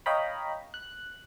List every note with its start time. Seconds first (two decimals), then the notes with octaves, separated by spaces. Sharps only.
0.06 C#5 D#5 F5 G5 A#5 B5
0.74 F#6